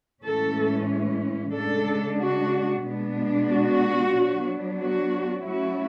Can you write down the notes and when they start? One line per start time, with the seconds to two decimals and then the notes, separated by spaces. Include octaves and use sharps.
0.24 A2 E3 G#3 C#4 A4
1.55 C#3 G#3 D4 A4
2.20 F#4
2.85 B2 G#3 B3 D4
3.51 F#4
4.15 F#3 B3 D4
4.81 F#4
5.46 F#3 A3 C#4 E4 F#4